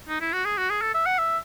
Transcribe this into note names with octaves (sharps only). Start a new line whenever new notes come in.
D#4
E4
F#4
G#4
F#4
G#4
A4
E5
F#5
E5